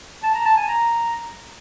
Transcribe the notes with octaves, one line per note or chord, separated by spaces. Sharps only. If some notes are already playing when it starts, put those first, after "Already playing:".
A5
A#5
A5
G#5
A#5